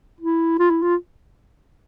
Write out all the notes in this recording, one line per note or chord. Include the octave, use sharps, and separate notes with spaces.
E4
F4
E4
F4